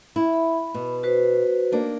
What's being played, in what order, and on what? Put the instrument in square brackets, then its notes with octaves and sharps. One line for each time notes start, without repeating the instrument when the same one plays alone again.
[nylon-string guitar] E4
[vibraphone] B5
[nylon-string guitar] B2
[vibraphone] F#4 B4 C5
[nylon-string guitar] A#3 D4 D#4